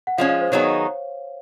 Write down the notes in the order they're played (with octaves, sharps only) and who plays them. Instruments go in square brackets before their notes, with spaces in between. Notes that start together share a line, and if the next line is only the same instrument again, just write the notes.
[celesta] F#5
[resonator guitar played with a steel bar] F3 G#3 C#4 [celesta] F5
[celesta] F5
C5
[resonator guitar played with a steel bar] D#3 F#3 B3 D#4 G#4 [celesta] C#5